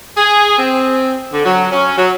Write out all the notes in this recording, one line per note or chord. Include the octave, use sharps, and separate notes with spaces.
G#4
C4
D3
F#3
C#4
F#3